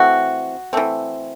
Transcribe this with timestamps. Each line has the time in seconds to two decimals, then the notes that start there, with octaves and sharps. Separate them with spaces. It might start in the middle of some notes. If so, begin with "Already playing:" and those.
Already playing: E3 A3 C4 F#4
0.73 E3 A3 C4